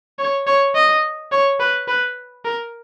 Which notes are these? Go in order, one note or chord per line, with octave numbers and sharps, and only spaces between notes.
C#5
C#5
D#5
C#5
B4
B4
A#4